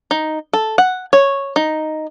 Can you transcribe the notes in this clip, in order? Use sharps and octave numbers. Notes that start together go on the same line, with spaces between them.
D#4
A4
F#5
C#5
D#4